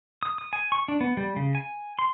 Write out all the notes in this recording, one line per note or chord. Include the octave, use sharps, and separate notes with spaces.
D#6
D#6
G#5
C#6
D4
B3
G3
C#3
G#5
C6